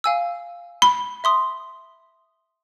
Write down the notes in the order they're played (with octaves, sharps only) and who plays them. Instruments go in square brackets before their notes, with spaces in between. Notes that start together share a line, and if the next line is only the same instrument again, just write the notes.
[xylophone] F5 G#5 E6
[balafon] B5
[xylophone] E5 C6 D#6